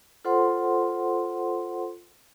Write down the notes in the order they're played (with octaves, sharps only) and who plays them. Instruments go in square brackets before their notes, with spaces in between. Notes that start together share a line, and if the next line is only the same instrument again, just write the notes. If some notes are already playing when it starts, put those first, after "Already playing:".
[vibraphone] F4 A4 C5 F#5 C6